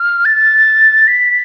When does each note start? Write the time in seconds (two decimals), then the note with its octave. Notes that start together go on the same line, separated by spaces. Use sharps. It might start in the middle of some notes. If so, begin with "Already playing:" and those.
Already playing: F6
0.25 A6
1.07 B6